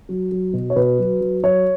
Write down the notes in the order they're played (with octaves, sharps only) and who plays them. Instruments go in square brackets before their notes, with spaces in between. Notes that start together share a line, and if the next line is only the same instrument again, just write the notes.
[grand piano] F#3
F#3
B2
C#5
B2 B4
F#3
F#3
F#3 C#5